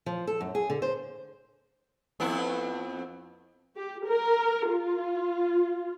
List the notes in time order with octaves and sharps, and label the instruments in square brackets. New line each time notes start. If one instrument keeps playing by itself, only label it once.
[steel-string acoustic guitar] F3
A4
F#2
G#4
D3
C5
[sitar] F2 B3 E4
[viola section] G4
A#4
F4